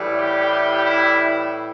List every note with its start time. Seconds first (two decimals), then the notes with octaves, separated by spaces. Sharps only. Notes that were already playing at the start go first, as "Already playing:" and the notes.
Already playing: A2 E3 G3
0.16 G4
0.84 E4